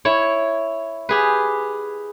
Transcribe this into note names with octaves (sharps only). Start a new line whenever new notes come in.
E4 C#5
G4 G#4 B4